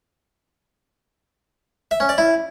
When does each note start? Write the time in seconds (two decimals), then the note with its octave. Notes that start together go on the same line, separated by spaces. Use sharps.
1.91 E5
2.00 C#4
2.09 D5
2.18 E4